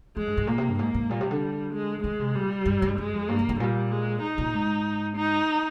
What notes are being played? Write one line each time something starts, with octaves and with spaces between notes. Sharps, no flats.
F3 G#3
G2
G#2
A#2 A#3
C3
G2
G#2 A#3
G#2
A#2 G3
C3
D3
G#3
D#3 G#3
C3
A#2 G3
G2
G2
G2 G#3
F2
G2 A#3
G2
G2
A#2 G3
G#3
D#4
A#2
G#2
D#4